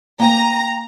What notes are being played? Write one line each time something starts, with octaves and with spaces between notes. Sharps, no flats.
A#3 G5 G#5 A#5